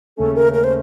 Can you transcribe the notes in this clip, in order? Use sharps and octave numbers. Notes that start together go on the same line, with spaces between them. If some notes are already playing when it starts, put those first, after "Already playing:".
D#2 C#3 A3 C#4 A4
A#4
A#4
C5